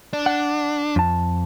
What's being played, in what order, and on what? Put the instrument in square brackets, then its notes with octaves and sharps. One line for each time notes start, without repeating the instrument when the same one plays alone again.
[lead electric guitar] D4
[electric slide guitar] F#5
F2 A5